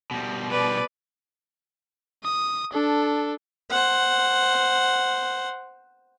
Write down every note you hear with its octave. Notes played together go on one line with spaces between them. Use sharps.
B2 G3
B4 D5
D#6
D4 A4
C5 F#5